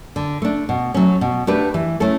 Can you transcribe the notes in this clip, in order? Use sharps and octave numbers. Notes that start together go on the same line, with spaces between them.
D3
A3 D4
B2
F#3 A3 C#4
B2
A3 D4 G4 B4
E3
A3 C#4 E4 A4